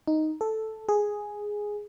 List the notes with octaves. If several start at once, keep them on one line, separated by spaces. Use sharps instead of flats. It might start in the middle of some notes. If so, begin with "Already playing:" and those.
D#4
A4
G#4